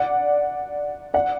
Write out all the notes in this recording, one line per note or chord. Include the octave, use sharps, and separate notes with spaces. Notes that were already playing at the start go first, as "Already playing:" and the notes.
Already playing: D5 F#5
D5 F#5